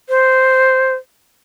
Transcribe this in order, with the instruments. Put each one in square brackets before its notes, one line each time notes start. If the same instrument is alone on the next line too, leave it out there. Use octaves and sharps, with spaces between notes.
[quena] C5